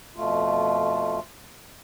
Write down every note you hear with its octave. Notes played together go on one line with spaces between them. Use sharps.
F2 B2 A3 F4